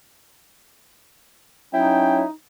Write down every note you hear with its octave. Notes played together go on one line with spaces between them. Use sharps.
F#3 C#4 D#4 E4 G5